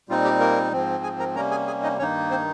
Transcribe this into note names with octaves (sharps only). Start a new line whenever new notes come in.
A#2 G3 C4 D#4 F4
G4
A#3 A#4
G#2 F3 C4
G#4 G#5
A#4 A#5
C3 G3 A#3 C#4 A#4 A#5
G#4 G#5
G#4 G#5
D#4 D#5
G2 D#3 A#3 C#4 D#4 C#5
C4 C5